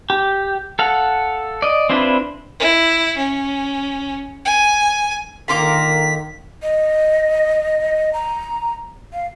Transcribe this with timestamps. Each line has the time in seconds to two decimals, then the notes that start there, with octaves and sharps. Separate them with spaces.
0.10 G4
0.79 A4 F5 F#5
1.62 D5 D#5
1.89 C4 D4 E4 F4 B4
2.59 E4
3.17 C#4
4.45 G#5
5.48 D3 D#3 A#3 F4 A#4 C6 D6 B6
6.63 D#5
8.13 A#5
9.13 F5